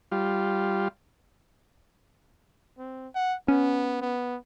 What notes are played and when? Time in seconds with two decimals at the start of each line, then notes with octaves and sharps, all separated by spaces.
0.12 G3 F4
2.78 C4
3.15 F#5
3.48 B3 C#4
4.01 B3